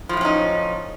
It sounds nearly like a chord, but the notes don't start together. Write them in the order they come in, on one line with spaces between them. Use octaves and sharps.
F3 A2 F#3 C#4 D#4